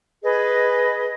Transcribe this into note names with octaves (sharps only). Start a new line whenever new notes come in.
G#4 B4 D#5